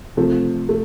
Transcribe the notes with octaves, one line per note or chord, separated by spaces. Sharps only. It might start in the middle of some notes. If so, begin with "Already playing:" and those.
C3 F3 A3
A3